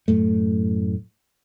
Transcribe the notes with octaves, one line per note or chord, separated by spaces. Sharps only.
F#2 A2 A3